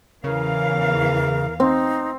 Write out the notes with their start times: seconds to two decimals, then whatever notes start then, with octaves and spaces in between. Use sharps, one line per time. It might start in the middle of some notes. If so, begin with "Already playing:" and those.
0.24 E2 C#3 E3 A#4 F5
1.60 C4 D#4